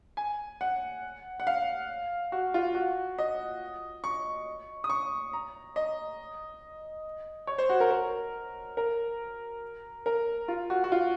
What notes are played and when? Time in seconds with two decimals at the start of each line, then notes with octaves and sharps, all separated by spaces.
0.17 G#5
0.61 F#5
1.40 F#5
1.47 F5
2.32 F#4
2.54 F4
2.75 F#4
3.18 D#5
4.04 C#6
4.84 D#6
4.90 C#6
5.33 A#5
5.76 D#5
7.47 C#5
7.58 C5
7.69 F#4
7.80 A#4
7.91 A#4
8.77 A#4
10.06 A#4
10.48 F4
10.70 F#4
10.84 F#4
10.92 F4